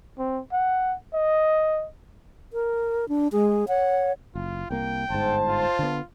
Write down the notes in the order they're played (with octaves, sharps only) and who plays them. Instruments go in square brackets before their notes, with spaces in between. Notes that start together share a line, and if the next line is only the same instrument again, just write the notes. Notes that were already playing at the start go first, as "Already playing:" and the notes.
[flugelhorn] C4
F#5
D#5
[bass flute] A#4
D4
[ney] G#3 [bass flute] G#4
[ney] C#5 [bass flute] F#5
[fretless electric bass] F#1 [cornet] F4
[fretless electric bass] C2 A#3 [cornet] G5
[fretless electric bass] G1 G#2 [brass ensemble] C5 A5
[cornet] F4
[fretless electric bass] D3 B3